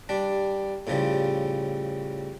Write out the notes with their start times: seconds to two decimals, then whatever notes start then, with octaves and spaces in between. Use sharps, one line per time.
0.09 G3 D4
0.87 A2 C#3 F3 G3